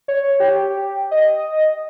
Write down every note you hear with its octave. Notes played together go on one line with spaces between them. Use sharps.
C#5
G4
D#5